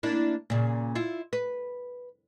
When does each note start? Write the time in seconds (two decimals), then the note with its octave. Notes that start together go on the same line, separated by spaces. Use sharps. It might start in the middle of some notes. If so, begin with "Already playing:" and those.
0.03 A#3 D4 E4
0.50 A#2 C#3
0.95 E4 F4
1.33 B4